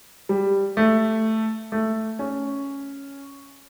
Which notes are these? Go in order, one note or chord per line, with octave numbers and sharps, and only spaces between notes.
G3
A3
A3
C#4